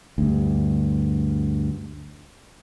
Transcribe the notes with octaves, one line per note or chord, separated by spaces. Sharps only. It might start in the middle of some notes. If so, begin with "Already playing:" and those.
D2 G2